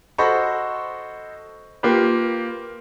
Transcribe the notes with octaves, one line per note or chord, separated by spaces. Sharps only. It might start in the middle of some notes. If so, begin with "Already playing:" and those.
F#4 A4 C5 D#5 B5 C#6
A#3 F4 G4 B4